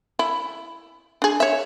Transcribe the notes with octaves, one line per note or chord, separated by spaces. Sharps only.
E4
D4 G#4
C#5 E5